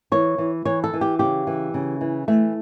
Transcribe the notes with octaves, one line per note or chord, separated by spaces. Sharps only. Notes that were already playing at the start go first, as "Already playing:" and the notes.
E3 C#5
E3
E3 C#5
A4
E3
G4
C#3 G4
E3
C#3
E3
E3 A3